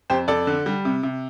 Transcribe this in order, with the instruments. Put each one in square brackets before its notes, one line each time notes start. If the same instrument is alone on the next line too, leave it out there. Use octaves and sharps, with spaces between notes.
[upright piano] F2 G4 C5
F2 A4 D5
D3
G3
C3
C3